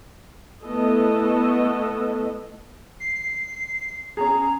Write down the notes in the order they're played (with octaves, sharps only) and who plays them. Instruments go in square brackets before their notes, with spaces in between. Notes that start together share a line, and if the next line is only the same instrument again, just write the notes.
[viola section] A3 B3 E4 A4 D#5
[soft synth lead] C7
[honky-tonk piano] C#4 G#4 [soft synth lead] A#5